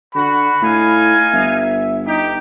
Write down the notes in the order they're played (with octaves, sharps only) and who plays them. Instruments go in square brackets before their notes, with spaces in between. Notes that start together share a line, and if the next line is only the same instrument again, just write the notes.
[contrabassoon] D3 [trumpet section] F#4 [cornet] B5
[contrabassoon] A2 [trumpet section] D#4 F5 G#5
[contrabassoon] G1 [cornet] E5
[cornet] D#4 [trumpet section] G4